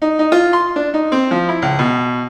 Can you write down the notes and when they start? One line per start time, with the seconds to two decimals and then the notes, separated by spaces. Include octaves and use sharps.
0.02 D#4
0.19 D#4
0.32 F4
0.53 C6
0.76 D4
0.94 D#4
1.12 C4
1.31 F3
1.49 E4
1.62 C#2
1.79 B2